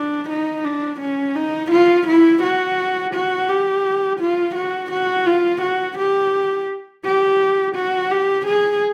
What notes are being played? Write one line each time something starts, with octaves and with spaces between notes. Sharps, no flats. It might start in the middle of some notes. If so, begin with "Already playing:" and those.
Already playing: D4
D#4
D4
C#4
D#4
F4
E4
F#4
F#4
G4
F4
F#4
F#4
F4
F#4
G4
G4
F#4
G4
G#4